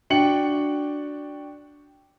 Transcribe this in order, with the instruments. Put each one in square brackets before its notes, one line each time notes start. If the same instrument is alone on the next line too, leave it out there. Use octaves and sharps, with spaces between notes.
[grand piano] D4 F#4 G5 C#7 F#7